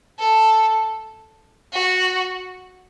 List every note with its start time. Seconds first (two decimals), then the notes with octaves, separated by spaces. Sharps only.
0.19 A4
1.73 F#4